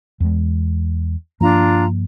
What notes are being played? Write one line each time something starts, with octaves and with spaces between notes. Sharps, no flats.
E2 G#3
G2 F3 A#3 D4 F4 A#5